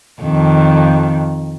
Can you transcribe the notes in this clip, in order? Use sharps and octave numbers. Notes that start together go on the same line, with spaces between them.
F2 D#3